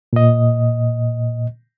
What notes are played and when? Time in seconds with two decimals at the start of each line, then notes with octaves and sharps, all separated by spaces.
0.13 A#2 D#5